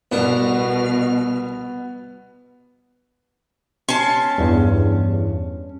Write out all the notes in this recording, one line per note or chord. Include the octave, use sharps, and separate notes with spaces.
C2 B2 B3 D4 F#5 F6
C#4 A5 C6
E2 G2